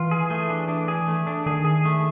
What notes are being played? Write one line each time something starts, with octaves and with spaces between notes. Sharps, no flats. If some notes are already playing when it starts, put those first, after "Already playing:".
Already playing: E3 F4
G#4
A3
D4
D4
G#4
A3
D4
D#3 G#4
G#4
A3